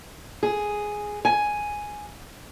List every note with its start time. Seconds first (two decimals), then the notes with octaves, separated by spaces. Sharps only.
0.43 G#4
1.25 G#5